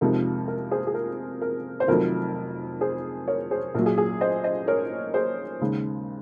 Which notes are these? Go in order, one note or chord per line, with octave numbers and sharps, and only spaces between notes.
F2 C3 F3 G#3 D#4 A#4
A#4
G#4 C5
G#4
A#4
A#4
C5
F1 F2 D#3 F#3 A#4
G#4 C5
A#4 C#5
G#4 C5
A#1 A#2 F#3 A#4
G#4
G#4
C5 D#5
C5 D#5
A#4 C#5
G#4 C5
D#2 C#3 G#3 D#4